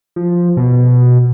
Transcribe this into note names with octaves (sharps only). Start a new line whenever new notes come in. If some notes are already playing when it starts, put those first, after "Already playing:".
F3
B2